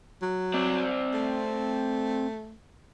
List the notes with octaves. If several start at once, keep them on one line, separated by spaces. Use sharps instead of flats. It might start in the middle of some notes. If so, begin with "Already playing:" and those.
F#3
C4 D5
A3